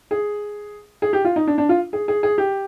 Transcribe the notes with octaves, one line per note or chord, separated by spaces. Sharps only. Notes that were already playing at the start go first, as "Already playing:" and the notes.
G#4
G#4
G4
F4
D#4
D4
D4
F4
G#4
G#4
G#4
G4